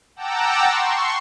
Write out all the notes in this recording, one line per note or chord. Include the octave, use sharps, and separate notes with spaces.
F#5 G5 A5 A#5 D6 E6
C6 C#6